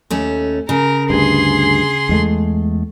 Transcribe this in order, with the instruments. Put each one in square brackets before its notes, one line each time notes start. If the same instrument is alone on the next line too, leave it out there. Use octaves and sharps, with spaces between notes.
[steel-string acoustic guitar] D#2 A3 C#4
[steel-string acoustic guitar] C#3 [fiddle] A#4
[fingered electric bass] D2 G2 [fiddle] G#4 C6
[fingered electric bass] E2 G#3 A3